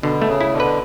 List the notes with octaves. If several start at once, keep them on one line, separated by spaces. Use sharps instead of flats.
B2 D3
A3
C#3
E4
B2 D3
B4